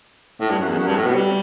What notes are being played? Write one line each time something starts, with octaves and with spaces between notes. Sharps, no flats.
A2
G2
F#2
E2
F#2
G2
A2
B2
G3